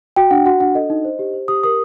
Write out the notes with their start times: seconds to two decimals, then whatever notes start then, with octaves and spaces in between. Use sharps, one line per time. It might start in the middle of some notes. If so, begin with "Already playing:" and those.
0.16 F#4 G5
0.31 D4 F#5
0.46 F#4 F#5
0.60 D4 F#5
0.75 A4 D#5
0.90 D#4
1.05 C5
1.19 G4
1.34 C5
1.48 G4 D#6
1.63 A#4 D#6